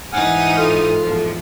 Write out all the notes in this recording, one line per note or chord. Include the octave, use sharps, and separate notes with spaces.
G#2 E3 D#4 F#5 G#5 D#6 F6
F4 A4 F6
E2 F3